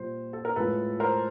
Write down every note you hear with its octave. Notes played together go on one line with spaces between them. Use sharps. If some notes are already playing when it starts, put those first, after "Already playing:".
Already playing: A#2 G3 C5
A4
A#4
A2 F3 G#3 A4 B4
A#4 C5